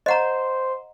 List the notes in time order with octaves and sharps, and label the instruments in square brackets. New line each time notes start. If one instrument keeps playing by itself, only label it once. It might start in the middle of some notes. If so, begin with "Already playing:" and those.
[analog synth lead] C5 [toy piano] D#5 F#5 A#5